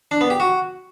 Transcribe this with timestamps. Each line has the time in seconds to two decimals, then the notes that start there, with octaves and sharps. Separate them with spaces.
0.11 D4
0.21 B3
0.30 G4
0.40 F#4